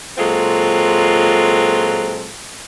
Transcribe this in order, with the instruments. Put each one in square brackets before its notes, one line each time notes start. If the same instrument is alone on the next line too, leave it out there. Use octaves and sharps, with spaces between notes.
[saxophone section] A#2 F#3 G#3 C4 F4 A4